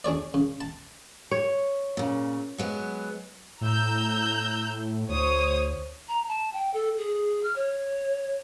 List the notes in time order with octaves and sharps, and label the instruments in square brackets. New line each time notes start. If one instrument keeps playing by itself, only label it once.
[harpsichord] D4 G#4 C#5 D5
C#3
A5
[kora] C#5
[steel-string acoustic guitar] A#2 C#3
F#3 G#3 B3
[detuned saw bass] A2 [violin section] A#5 E6 G6
[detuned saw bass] D2 [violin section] C5 C#5 D#6
[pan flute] A#5
A5
G5
A4
G#4
F6
C#5